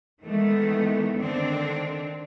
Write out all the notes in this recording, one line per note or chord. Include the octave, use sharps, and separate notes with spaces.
D#3 E3 G#3 A3 B3
D3 D#3 C4 D4